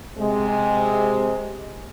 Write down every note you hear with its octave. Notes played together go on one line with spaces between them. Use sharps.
C3 G#3